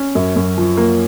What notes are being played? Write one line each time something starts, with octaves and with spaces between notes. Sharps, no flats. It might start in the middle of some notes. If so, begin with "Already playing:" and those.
Already playing: C#4
F#2
F#2
F3
A#3